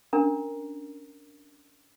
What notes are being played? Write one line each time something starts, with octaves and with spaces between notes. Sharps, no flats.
C#4 D4 A#4 A#5